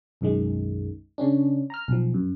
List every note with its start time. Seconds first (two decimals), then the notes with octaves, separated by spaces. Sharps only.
0.21 B1 F#2 D#3 G#3
1.18 C#3 C#4 D4
1.70 A#5 F6
1.88 B1 F3
2.14 F#2